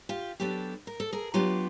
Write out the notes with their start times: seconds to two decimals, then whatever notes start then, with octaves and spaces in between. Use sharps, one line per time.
0.09 F4 G4
0.40 F#3 B3 D4 G4 A4
0.87 A#4
1.00 A4
1.12 G#4 A#4
1.34 F#3 B3 D4 F4 G4